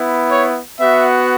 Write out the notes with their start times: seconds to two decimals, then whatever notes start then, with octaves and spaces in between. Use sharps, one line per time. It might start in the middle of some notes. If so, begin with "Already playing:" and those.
Already playing: B3 E4
0.30 C#5
0.79 B3 F#4 E5